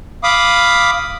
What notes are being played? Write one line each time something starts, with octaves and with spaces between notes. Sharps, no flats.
F5 B5 D6 D#6